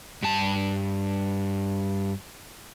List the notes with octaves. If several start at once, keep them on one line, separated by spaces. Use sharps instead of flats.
G2 A5